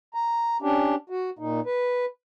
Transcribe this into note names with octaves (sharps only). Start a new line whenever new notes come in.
A#5
C#4 D4 G4
F#4
A#2 D#4
B4